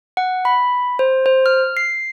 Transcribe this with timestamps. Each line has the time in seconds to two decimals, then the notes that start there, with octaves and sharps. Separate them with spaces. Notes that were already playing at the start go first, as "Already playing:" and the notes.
0.17 F#5
0.45 B5
0.99 C5
1.26 C5
1.46 F6
1.77 C7